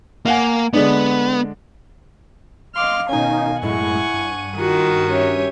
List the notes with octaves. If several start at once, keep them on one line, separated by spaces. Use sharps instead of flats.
A#3 F5 F#5 G#5
D3 G#3 B3 D4
D#5 F5 C6 D6 F6
B2 D#3 C#4 D#4 G#5
F#2 A2 G#3 E4 F#5 G#5 C#6
G2 D#7
D#3 F4 F#4
C#4 G4 C#5 E5